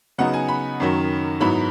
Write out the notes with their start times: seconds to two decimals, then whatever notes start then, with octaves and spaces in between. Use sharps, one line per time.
0.18 C#3 F#3 B3 D#4 F#5
0.34 G#5
0.48 B5
0.80 F#2 D#3 F#3
1.41 G#2 F#3 B3 E4 B5